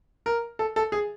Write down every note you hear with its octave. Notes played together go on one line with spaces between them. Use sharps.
A#4
A4
A4
G#4